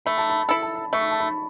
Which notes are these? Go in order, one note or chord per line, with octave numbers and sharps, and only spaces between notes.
A3 B5
A5
B5
E4 A4 B5
A5
B5
A3 C#6
B5
A5
B5